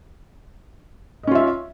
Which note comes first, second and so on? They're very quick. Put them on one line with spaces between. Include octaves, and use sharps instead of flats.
D#5 C#4 F4 E5